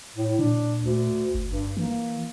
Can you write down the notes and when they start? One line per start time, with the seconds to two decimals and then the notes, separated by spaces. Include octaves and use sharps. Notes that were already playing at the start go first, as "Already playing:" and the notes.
0.15 A2
0.39 A#2 D4
0.82 D2
1.35 G1
1.49 G2
1.77 E3 A#3